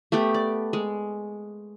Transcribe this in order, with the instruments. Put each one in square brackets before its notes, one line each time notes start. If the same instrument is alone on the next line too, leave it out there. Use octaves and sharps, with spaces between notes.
[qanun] A3 B3 G4 G5
D5
G#3